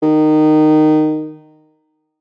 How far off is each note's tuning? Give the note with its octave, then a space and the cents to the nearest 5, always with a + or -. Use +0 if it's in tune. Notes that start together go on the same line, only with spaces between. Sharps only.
D#3 -15